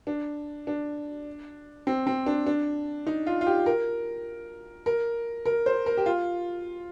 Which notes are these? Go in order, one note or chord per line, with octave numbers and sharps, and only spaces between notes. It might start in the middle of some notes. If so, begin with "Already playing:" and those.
D4
D4
C4
C4
D4
D4
D#4
F4
F4
G4
A#4
A#4
A#4
C5
A#4
G4
F4